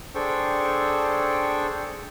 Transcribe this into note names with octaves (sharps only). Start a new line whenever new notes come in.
D4 G#4 A4 C5 G5 C#6